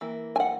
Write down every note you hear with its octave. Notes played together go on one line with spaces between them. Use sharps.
E3 A#3
G#5
F#5